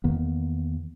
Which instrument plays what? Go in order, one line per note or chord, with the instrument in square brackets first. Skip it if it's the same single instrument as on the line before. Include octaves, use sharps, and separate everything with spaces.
[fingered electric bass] E2 D#3 A#3 B3